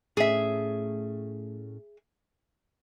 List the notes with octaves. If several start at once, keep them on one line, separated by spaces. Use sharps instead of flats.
A2 A3 C#4 G#4 E5